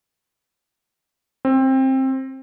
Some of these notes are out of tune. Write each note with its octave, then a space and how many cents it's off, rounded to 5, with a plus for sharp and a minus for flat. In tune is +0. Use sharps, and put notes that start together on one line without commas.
C4 +20